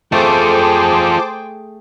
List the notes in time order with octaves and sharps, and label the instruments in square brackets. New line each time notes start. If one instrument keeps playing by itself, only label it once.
[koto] A3 [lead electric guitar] F4 A4 [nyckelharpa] G#4 G5 [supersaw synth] C5 A5 D6